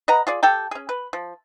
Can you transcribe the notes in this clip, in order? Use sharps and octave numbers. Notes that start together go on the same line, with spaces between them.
B4 D#5 F#5 A#5
F4 G#4 D5
G4 A4 G5 A5
C#4 G#4
B4
F3